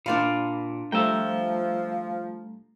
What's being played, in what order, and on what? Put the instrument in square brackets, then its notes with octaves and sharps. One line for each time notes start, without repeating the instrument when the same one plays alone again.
[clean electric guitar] A#2 [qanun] D4 D5 F5 [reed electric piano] B5 C6
[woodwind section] F3 [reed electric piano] G3 A3 A#5 [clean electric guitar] E5 G5